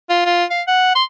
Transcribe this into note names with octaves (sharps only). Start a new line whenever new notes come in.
F4
F4
F5
F#5
C6